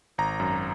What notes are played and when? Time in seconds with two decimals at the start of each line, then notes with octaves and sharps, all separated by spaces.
0.18 G#1 A#5
0.40 F#2